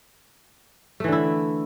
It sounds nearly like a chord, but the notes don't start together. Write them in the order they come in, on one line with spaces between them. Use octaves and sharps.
A3 E3 D3 E4